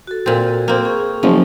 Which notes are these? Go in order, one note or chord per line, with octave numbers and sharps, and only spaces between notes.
F#4 A4
A#2 C4
A#3 C4
G#4 C#6
F#1 F3